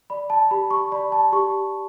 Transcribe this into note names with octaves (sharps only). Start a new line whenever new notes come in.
D5 B5
A5
G4 B5
C#6
D5 B5
A5
G4 C#6